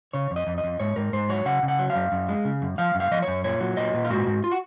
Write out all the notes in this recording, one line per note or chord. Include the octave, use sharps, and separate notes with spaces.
C#3 C#5
F2
D#5
F2
D#5
F2
G#2 C#5
G#2 A#4
G#2 C5
F#3 C#5
C#3 F#5
C#3
F#5
F#3
F5
F#2
F#2
G#3
C#3
F#2
F3 F5
F#2
F5
F3 D#5
C#5
F#2
A#2 C#5
F#3
A#2 D#5
A#2
F4
G#2 F#4
G#2
F4
F#4